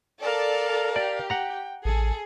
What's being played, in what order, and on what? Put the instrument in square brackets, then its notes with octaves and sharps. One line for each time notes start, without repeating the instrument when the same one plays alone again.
[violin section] A4 D5 A5 [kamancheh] A#4 F5
[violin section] G4 [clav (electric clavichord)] D5
[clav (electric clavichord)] F#5 A#5 [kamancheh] G5
[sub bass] A1 [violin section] G#4 [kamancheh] A4